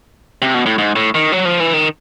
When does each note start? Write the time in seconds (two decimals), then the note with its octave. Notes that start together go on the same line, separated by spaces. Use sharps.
0.42 C3
0.54 B2
0.66 A2
0.78 G#2
0.96 A2
1.15 D#3
1.32 F#3
1.45 F3
1.60 E3
1.73 D#3